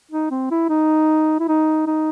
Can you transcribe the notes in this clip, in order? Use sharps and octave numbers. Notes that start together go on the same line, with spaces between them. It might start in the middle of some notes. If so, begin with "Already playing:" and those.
D#4
C4
E4
D#4
E4
D#4
D#4